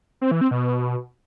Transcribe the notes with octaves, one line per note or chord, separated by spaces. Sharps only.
C4
E3
C4
B2